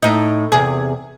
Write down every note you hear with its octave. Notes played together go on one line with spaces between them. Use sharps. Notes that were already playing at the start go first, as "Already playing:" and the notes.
A2 D#4
E2 C3 G#4